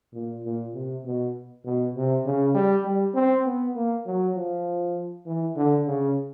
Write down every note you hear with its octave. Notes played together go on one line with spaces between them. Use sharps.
A#2
A#2
C3
B2
B2
C3
C#3
G3
G3
C4
B3
A#3
F#3
F3
E3
D3
C#3